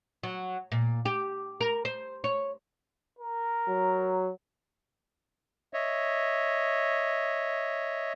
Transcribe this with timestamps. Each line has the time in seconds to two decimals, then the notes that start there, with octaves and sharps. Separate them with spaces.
0.23 F#3
0.72 A#2
1.05 G4
1.61 A#4
1.85 C5
2.24 C#5
3.19 A#4
3.68 F#3
5.73 C#5 D#5 E5